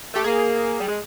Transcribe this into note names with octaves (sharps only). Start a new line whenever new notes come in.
A3 G4
A#3 G#4
G3
G#3